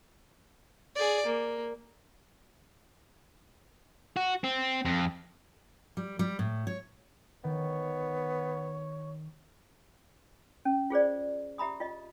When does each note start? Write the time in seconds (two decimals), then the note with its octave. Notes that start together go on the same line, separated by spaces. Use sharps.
0.96 G#4 D5
1.26 A#3
4.16 F#4
4.44 C4
4.85 F2
5.97 G3
6.19 G3
6.39 A2
6.67 C#5
7.44 D#3 B3 C#5
10.65 C#4
10.90 F4 G#4 C5 D5
11.58 G4 E5 A#5 B5 D#6
11.80 F4 D#5